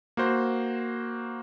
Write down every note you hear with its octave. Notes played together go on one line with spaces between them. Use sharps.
A#3 F#4 C5